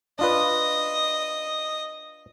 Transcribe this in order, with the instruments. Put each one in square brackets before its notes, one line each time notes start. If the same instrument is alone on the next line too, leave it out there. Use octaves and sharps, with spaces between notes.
[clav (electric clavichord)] D4 F4 B4 [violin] D#5